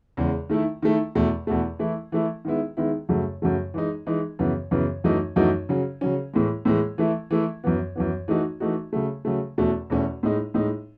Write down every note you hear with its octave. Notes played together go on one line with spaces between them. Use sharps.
E2 C#3 G#3
D#3 A3 E4
D#3 A3 E4
E2 B2 A3
E2 B2 A3
E3 A3 E4
E3 A3 E4
D#3 G#3 B3 E4
D#3 G#3 B3 E4
F#2 C#3 F#3 A3
F#2 C#3 F#3 A3
E3 G#3 D#4
E3 G#3 D#4
F#2 C#3 E3 B3
F#2 C#3 E3 B3
F#2 E3 A3 D#4 F#4
F#2 E3 A3 D#4 F#4
C#3 F#3 C#4
C#3 F#3 C#4
A2 E3 G#3
A2 E3 G#3
E3 A3 E4
E3 A3 E4
F#2 E3 B3
F#2 E3 B3
E3 A3 D#4 F#4
E3 A3 D#4 F#4
C#3 F#3 A3
C#3 F#3 A3
E2 B2 A3 C#4 F#4
E2 B2 A3 C#4 F#4
A2 G#3 D#4
A2 G#3 D#4